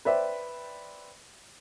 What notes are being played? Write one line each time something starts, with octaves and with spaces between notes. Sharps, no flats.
B4 C5 D5 E5 G5